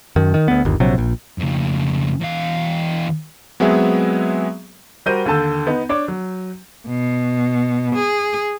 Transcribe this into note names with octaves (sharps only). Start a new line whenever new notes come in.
F#2 D#3
D#3
D2 B3
G1 D#2
A#1 C3 F#3
A#1
F2 C#3
E2 F5
F#3 G#3 B3 C4 G#4 E5
G3 F#4 A#4 C5 G6 D#7
D#2 D3 A4 A5
B3 D#4
D4 C#5 D6
F#3
B2
G#4